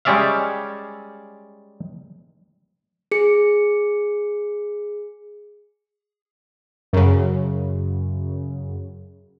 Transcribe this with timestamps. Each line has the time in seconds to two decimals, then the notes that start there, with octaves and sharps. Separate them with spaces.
0.05 G3 G#3 C#4 D5 E5 F5
3.12 G#4 C#7
6.93 F#2 C#3